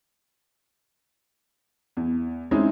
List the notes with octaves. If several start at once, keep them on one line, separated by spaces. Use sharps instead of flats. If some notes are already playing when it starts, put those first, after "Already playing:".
E2
G#3 C4 C#4 D#4 E4